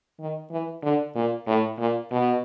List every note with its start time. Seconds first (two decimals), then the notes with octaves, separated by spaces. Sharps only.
0.20 D#3
0.51 E3
0.83 D3
1.15 A#2
1.47 A2
1.79 A#2
2.11 B2